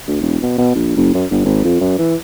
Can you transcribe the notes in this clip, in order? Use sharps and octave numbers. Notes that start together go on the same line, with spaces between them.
D2
E1
B2
B2
A#1
F#1
F#2
G1
G#1
F2
F#2
E3